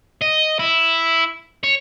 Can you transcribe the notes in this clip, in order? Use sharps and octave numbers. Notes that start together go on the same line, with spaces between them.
D#5
E4
C#5